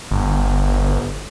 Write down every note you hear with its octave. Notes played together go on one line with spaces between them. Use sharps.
G1